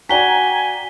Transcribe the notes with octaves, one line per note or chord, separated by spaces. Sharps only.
F#4 D5 G5 G#5 A#5 B6 G7